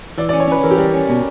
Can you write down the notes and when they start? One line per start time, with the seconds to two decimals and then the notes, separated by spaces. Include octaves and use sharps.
0.18 E3 D5
0.29 D5
0.33 C#4
0.40 C#5
0.48 C#4 B4
0.63 E3 A#4
0.71 G4
0.78 G3 A#4
0.94 C#4
1.09 B2